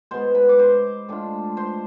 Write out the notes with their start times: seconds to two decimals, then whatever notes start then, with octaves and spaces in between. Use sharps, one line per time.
0.11 B2 G#3 B3 C5 C6
0.34 B4 B5
0.49 D6
0.59 C5 C6
1.09 A2 G#3 D4 F4
1.57 C5 C6